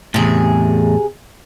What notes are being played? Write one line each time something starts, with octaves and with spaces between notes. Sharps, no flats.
E2 A2 C3 G#4